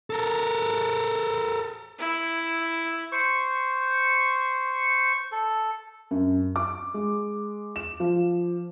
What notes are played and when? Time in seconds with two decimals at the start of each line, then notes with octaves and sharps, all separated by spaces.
0.10 A4 A#4
1.99 E4
3.12 C5 C#6
5.32 A4
6.11 F#2
6.56 D6
6.94 G#3
7.76 E7
8.00 F3